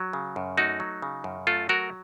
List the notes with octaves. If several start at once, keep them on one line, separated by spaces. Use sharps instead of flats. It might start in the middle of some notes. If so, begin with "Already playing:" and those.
Already playing: F#3
C#3
F#2
A3 D#4 F#4
F#3
C#3
F#2
A3 F4 A4
F#3 F#4 A#4